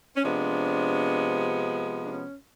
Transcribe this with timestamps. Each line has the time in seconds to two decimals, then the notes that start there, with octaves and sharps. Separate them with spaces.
0.16 C#4
0.24 C3 F3 G#3 B3 D4
2.04 D4
2.13 C#4